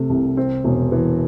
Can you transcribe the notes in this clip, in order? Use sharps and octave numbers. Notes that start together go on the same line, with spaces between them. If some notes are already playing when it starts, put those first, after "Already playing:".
Already playing: C3 A3
C2
C4
E1
E3